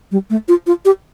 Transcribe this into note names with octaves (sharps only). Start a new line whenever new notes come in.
G3
A3
F4
F4
G4